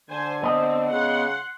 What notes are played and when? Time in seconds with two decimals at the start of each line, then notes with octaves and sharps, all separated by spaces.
0.10 D3 C5 G#5
0.43 B3 C4 D#5
0.90 C#3 F#5 C6